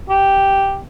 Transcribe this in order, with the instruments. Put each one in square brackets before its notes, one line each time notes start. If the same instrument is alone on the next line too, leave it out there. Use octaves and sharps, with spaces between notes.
[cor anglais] G4